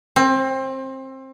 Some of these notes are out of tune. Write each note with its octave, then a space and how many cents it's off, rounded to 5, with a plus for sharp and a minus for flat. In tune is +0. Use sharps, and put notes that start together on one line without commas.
C4 +25